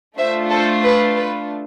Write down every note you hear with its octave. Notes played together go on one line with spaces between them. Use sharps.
A3 D4 F4 C5 E5
A4 C5
B4
B4